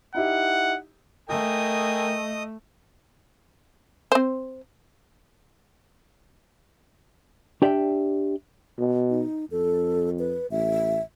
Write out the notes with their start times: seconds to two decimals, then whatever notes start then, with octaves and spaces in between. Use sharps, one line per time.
0.15 D#4 E4 G4 F#5
1.29 A3 A#4 D#5 G5 G#5 D#6
4.12 C4 C5
7.62 D4 G4 D5 E5 F5 G5
8.79 B2
9.10 D#4
9.51 F2 A4
10.19 B4
10.51 A1 E5